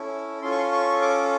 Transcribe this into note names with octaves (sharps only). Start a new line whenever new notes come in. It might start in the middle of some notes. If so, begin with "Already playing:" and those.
Already playing: C#4 E4 A4
C#4 F4 A4 C6
C#6
C6
C#6
D6